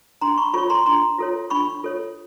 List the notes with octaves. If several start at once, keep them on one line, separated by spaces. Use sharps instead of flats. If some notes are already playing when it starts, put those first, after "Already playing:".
D4 A#5 C6
B5 C#6
F4 A4 C#5 B5 C#6
A#5 C6
D4 A#5 C6
F4 A4 C#5
D4 B5 C#6
F4 A4 C#5